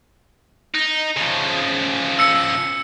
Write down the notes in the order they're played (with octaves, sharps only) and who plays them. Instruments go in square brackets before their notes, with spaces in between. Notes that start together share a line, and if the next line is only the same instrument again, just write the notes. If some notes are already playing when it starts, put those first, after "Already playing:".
[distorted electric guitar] D#4
C#3 F3
[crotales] E6 C#7